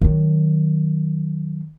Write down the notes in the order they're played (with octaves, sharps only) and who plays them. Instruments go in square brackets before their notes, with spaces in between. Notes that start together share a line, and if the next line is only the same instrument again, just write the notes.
[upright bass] D#3 F#3